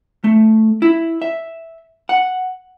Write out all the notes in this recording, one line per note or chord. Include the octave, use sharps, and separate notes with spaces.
A3
E4
E5
F#5